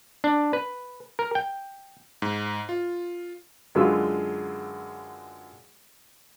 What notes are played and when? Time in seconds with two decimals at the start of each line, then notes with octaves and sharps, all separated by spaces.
0.24 D4
0.53 B4
1.19 A#4
1.35 G5
2.22 G#2
2.69 F4
3.75 F#2 D3 G#3 F4 B4 E6